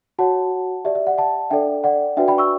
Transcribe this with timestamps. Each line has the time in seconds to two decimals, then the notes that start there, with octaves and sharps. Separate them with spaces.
0.19 F#4 C#5 F#5 A5
0.85 G4 D5 E5
0.95 E5
1.07 D5 F#5
1.18 F#5 A5
1.50 D4 A4 D5 E5 G5
1.84 D5 F#5
2.17 D4 F#4 B4 D5 E5 G5
2.28 G5 B5
2.38 C#6 E6